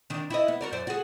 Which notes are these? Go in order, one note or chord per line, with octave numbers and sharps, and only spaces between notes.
D#3 D4
E4 D#5
B3
F#4 A#4 D5
F#2 C5 D5
F#4 G#4